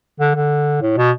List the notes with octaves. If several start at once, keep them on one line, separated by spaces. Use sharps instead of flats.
D3
D3
A2
B2